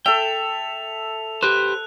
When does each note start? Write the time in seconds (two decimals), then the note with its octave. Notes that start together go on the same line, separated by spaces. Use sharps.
0.06 A4 E5 G5 F7
1.43 G4 B4 C5 F#6